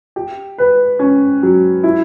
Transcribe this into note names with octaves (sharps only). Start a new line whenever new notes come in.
G4
B4
C#4
F#3
E4